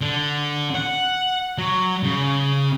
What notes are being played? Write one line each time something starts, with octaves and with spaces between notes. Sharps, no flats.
D3
F#5
F#3
C#3